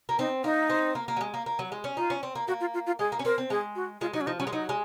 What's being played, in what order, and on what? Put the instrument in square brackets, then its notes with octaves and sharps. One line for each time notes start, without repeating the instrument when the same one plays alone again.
[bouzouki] A#3
[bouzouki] C4 [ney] D#4
[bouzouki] A#3 [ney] D#4
[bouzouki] C4
A#3
A#3
F#3
G#3
A#3
A#3
F#3
G#3
C#4
[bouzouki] D#4 [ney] F4
[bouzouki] C#4
C4
A#3
[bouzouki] A#3 [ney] F#4
[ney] F4
F4
F4
[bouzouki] G#3 [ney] G#4
[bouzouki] A#3
C#4
[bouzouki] C4 [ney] A#4
[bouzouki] C4
[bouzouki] G#3 [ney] G#4
[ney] F#4
[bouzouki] G#3 [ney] F4
[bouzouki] F#3 [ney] D#4
[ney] C#4
[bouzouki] F3 [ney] D#4
[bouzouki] F#3 [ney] C#4
[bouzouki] G#3
[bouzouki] F#3 [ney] D#4
[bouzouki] G#3